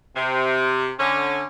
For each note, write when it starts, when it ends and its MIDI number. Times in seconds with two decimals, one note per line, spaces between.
0.16 0.92 48
0.99 1.44 50
0.99 1.44 61